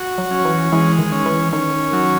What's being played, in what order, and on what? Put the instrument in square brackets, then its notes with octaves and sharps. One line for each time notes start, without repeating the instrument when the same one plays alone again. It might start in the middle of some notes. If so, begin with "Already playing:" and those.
Already playing: [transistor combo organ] F#4
[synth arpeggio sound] F#3
[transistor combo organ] C#4
[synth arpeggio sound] E3
[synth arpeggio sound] E3 [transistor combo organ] G#3
[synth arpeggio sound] D#3
[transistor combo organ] C#4
[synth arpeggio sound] E3
[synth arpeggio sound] D#3 [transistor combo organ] C#4
[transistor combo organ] F#3